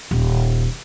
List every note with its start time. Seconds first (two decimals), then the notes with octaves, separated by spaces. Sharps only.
0.11 D#1